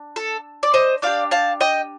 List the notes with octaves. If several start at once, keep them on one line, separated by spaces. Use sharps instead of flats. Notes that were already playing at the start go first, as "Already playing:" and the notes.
Already playing: D4
A4
D5
C5 D#5
D4 G4 D5 F5
F5 A5
D#5 G5